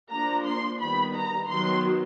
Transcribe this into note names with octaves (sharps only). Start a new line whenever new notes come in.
F3 A#3 D4 A#5
C6
D#3 G3 B3 B5
A#5
D#3 F#3 B3 C6